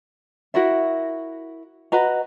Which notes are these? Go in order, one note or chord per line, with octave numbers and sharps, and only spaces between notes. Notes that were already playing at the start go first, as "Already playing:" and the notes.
E4 F#4 A#4 E5
F#4 B4 D#5 A#5